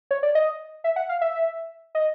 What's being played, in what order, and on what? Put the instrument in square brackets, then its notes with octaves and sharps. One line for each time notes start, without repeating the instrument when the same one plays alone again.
[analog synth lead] C#5
D5
D#5
E5
F#5
F5
E5
D#5